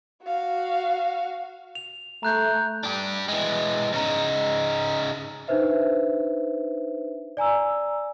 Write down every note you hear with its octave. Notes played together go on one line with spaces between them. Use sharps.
F#4 F5
F7
A3 A#5 F#6 G6
D4 G4
E3 G#3
C#3 D#4
D4 D#4 B4 C5 E5
D5 G#5 A#5 E6